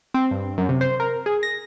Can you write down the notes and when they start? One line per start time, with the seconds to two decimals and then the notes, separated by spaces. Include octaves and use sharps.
0.14 C4
0.31 G2
0.58 F#2
0.69 C3
0.81 C5
1.00 A#4
1.26 G#4
1.43 A#6